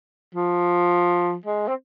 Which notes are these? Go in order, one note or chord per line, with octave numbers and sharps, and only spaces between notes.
F3
G#3
C4